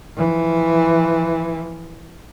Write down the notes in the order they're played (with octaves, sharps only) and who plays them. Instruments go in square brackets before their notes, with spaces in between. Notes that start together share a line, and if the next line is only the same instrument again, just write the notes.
[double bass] E3 F3